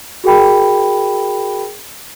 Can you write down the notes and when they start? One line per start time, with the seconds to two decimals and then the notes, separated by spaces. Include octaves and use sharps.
0.24 F#4 G#4 A#4 G5 B5